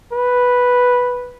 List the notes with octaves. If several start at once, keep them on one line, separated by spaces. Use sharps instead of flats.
B4